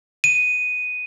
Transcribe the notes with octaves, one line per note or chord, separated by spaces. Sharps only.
D#7